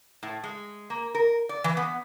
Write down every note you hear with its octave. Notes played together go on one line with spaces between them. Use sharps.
A2
G#3
A#3
A#4
D5
E3
B3